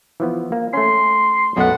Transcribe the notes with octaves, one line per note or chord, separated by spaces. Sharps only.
E3 F3 B3
A#3
A3 C#4 C6
B1 F#2 B2 A3 F#5